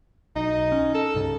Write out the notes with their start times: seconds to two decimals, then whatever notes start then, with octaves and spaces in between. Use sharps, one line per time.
0.36 B1 D#4
0.72 C#4
0.94 A4
1.14 C2 G2 C#3